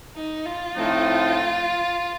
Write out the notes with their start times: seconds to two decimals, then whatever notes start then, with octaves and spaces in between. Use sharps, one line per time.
0.15 D#4
0.45 F4
0.75 A2 F3 A3 C4 D#4